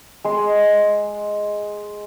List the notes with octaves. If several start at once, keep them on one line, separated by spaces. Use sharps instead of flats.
G#3 C6